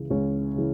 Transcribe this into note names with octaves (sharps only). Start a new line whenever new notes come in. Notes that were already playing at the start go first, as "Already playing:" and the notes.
Already playing: C#2 C#3 E3
C#2 C#4 C#5
C#3 E3